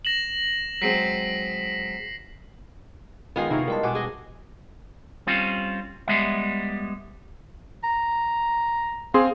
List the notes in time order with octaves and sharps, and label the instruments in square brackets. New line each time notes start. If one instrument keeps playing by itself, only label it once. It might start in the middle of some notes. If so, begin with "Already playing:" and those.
[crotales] A#6 E7 F#7
[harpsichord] F#3 G#3 C4 [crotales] B6 C7 D7
[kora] D#3 G#3 [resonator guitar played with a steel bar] B3 F4 G#4
[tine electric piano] C3 [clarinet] D#4 [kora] E4 A#4 C#5
[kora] G3 D5 [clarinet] G#3 [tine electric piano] A#4 D#5 A5
[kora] B2 D4 [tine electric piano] F#5 G#5 D6
[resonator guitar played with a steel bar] G#4 D#5
[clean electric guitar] G3 C4 C#4 F4
G3 G#3 B3 E5
[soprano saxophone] A#5
[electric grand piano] C4 G#4 C6 [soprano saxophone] F5